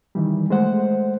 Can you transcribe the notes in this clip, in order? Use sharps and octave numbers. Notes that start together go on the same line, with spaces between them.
D#3 E3 G3
G#3 A3 C5 F#5